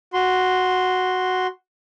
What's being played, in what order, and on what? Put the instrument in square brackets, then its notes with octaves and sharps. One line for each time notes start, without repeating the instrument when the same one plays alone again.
[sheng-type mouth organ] F#4 C6